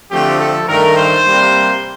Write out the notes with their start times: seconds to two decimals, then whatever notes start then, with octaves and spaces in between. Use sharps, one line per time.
0.11 D3 F3 A3 C4 G4
0.40 A4
0.68 G2 D#3 A3 A#4
0.97 C5
1.26 C3 G3 A#3